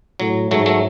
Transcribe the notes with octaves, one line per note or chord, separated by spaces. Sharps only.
A2 F#3
G#2 F#3 A3
F#3 A3